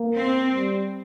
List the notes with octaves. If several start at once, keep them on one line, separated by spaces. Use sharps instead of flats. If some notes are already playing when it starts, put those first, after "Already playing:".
Already playing: A#3
C4
G3